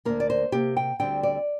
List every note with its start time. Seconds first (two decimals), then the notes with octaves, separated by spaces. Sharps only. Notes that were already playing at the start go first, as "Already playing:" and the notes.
0.05 D2 C3 A#3 A#4
0.20 D5
0.30 C5
0.52 C3 A#3 G4
0.77 G5
0.99 D2 D3 G3 C4 G5
1.23 D5